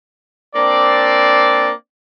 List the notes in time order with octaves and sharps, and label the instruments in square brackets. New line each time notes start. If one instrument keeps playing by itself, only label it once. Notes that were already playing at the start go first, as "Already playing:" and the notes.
[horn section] A#3 C4 D4 D5